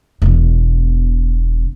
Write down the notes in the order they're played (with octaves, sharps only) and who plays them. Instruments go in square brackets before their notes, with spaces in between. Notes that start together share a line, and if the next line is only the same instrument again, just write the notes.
[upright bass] E1 B2